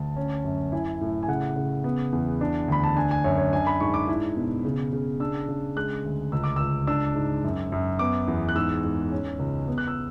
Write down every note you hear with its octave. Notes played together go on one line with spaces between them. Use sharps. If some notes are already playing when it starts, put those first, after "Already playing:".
Already playing: D2 A5
C#4
F#2
E4 G#5
A2
G#5
C#3 F#5
C#3
B3
E2
D4
D2 B5
A5
D4 G#5
G#5
F#2 C#5
C#5
D4 G#5
B5
G#2 C#6
D6
E4
B2
C#3
C#3
D4 E6
C#3
G#3 F#6
D2
C#2 E6
D6
C#2 E6
D4 E6
G#2
F#2
F#2
B3 D6
E2
F#6
G#2 E6
G#2
C#4
C#2
B3
F#6
E6